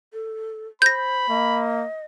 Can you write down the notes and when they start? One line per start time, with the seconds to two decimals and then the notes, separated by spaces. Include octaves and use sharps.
0.13 A4
0.82 C5 B5 G6 A#6
1.30 A#3 D#5